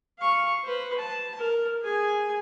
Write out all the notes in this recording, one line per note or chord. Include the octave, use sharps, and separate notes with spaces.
F5 C#6
B4 C5
A5
A#4
G#4 G#5